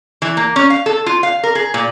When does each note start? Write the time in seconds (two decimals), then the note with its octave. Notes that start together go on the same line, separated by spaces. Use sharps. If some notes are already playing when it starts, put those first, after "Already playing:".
0.22 E3
0.37 A#3
0.56 C#4
0.70 F5
0.86 A4
1.06 F4
1.23 F5
1.44 A#4
1.55 G#4
1.74 A#2